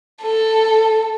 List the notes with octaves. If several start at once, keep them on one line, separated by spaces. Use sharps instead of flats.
A4